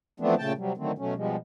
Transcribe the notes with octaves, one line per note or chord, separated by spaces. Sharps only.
E3 F3 A3 B3 C4 D4
A#2 C#3 A3 G5 A5
C3 F#3 G3
D3 D#3 F#3 A3 C4
B2 F#3 A3 C#4
B2 F3 G3 G#3